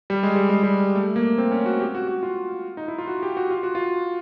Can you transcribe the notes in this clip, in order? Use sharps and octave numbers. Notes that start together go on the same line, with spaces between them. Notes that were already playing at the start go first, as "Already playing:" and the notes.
G3
G#3
G3
G#3
G3
A3
A#3
C4
C#4
F#4
G4
F#4
F#4
F4
D#4
E4
F4
F#4
G4
F#4
F4
F#4
F4